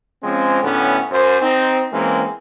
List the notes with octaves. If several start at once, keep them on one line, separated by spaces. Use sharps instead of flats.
F3 G#3 C4 C#4
D2 A2 D3 B3 C#4
F#2 C5
C4 D#4
E3 G#3 A#3 C4 C#4